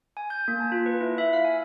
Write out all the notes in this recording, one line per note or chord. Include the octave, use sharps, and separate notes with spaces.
G#5
G6
A#3
A5
F4
B4
E4
E5
F5
G#5